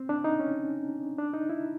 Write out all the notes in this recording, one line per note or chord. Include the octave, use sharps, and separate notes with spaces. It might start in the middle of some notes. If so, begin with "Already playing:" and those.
Already playing: C4
D4
D#4
C#4
D4
D#4
E4